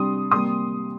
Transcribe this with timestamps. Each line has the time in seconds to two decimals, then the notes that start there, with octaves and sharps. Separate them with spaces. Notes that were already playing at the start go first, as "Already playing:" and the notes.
Already playing: C3 G3 D4 C6 D#6
0.31 C3 G3 A#3 C6 D#6